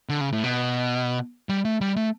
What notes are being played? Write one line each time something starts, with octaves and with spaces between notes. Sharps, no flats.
D3
C#3
A2
B2
G3
A3
G3
A3